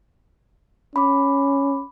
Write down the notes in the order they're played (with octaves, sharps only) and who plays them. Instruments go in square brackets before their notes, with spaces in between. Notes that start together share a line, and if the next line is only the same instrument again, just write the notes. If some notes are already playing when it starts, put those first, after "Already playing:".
[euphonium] C#4 [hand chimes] B5 D6